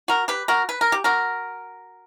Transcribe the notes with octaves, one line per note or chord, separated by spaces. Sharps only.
F#4 A#4
G4 B4
F#4 A#4
B4
A#4
G4
F#4 A#4